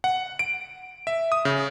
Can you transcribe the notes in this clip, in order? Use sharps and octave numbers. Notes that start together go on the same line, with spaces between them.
F#5
D7
E5
D#6
C#3